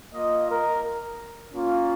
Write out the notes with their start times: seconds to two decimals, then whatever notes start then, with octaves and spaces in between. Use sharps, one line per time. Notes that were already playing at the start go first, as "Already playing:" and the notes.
0.14 A#3 F4 D#5
0.50 A#4
1.54 A#3 C#4 F4